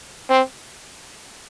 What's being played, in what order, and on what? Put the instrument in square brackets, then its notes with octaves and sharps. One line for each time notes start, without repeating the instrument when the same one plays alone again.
[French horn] C4